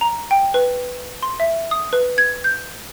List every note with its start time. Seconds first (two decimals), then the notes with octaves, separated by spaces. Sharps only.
0.01 A#5
0.31 G5
0.54 B4
1.23 C6
1.40 E5
1.71 D#6
1.93 B4
2.18 G#6
2.44 G6